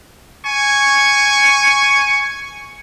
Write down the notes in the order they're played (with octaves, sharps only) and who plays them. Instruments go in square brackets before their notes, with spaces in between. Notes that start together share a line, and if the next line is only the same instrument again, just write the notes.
[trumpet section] G#5 C#6